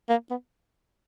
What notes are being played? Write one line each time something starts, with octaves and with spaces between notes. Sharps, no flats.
A#3
B3